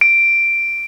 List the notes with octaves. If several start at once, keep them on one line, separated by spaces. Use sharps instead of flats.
D7